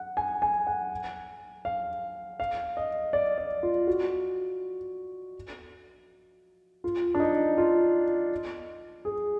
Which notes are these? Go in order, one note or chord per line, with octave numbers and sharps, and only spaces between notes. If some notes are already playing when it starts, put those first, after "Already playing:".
Already playing: F#5
G#5
G#5
F#5
F5
F5
D#5
D5
D5
F4
F#4
F4
D4
D#4
F4
G#4